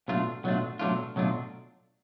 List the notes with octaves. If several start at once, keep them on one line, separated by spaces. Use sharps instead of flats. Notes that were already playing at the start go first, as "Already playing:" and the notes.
B2 F#3 A3 D4 F4
B2 F#3 A3 D4 F4
B2 F#3 A3 D4 F4
B2 F#3 A3 D4 F4